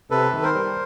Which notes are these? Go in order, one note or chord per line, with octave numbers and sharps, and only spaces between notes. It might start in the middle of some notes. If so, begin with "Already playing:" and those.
C3 A4 B4
D#3
A#4 C5
G3